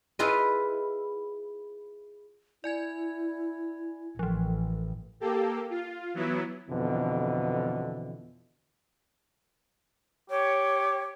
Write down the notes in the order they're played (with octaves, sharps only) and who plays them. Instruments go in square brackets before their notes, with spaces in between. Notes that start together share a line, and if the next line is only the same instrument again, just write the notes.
[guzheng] E4 F4 G#4 B4 D#5
[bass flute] E4 [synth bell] D5 G#5 G#6
[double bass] A1 [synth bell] E3 F3
[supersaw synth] A#3 G4 A4
F4
E3 F#3 B3 E4
[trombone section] F2 B2 D3 E3
[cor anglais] G4 [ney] C#5